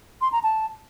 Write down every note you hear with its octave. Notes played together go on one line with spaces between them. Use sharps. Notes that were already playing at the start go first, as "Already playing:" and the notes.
C6
A#5
A5